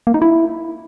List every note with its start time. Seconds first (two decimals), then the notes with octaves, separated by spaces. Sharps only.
0.07 A#3
0.14 D#4
0.22 E4